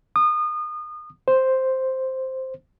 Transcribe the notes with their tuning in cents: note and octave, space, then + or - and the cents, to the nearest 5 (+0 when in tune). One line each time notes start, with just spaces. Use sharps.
D#6 -30
C5 +0